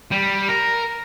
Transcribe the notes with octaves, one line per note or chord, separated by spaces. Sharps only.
G3
A#4